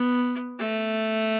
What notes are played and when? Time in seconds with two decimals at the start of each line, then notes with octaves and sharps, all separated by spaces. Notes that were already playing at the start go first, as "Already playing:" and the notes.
Already playing: B3
0.59 A3